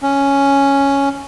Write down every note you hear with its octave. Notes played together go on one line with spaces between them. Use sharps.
C#4